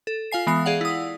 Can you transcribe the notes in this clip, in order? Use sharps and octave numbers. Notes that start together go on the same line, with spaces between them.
A4
F4 F5 G#5 C7
E3 G#3 B3 D#6 C7
G#4 D5 F5 F#5
E4 D#6